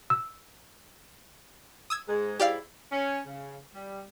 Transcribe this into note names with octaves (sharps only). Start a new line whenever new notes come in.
E6
D#6 E6 G#6
G#2 G#3
G#2 E4 G4 D5 F5
C#4
C#3
G3